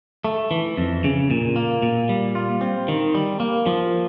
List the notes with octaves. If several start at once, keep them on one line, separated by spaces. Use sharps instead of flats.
A3
E3
F2
C#3
A#2
A#3
A#2
G3
F4
C4
D#3
G3
A#3
F3